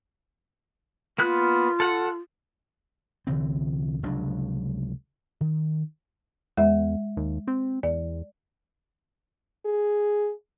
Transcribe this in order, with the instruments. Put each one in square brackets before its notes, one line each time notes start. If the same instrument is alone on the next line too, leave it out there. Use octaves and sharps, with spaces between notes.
[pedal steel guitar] A#3 B3 F#6 [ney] F4
[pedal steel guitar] A4 F#5
[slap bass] C2 D3 E3 C4
F1 C#2 F#3 D4
D#3
[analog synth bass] E2 [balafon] G#3 E5
[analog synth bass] D#2
C4
[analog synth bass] E2 [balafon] D5
[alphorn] G#4